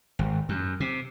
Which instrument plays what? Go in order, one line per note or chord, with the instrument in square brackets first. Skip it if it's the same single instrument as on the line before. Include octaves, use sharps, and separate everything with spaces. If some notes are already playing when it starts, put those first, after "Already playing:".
[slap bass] G#1
F#2
C3